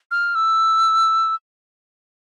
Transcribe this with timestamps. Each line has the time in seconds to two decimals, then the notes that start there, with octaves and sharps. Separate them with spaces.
0.11 F6
0.35 E6